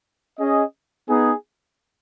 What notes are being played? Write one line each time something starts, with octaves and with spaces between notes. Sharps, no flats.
C#4 G#4 D#5
B3 D#4 G#4